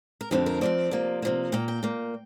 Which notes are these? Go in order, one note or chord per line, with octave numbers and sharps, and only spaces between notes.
A#4
F2 D3 F3 C4 G4
A#4
F2 D3 F3 C4 D5
C3 F3 A#3
C3 F3 A#3
A#2 A#3 G5
G5
A#2 A#3